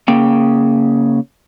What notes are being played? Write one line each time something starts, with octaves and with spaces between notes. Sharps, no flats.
C#3 A#3 G5